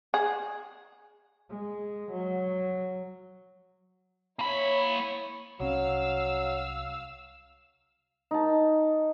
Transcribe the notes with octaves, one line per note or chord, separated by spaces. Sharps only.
G#4
G#3
F#3
A#3 E4 C#5 B5
C2 F#3 C#4 F5 E6
D#4 A5